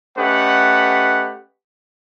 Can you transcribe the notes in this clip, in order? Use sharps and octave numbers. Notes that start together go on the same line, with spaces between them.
A3 C#4 G4 B4 D#5 F#5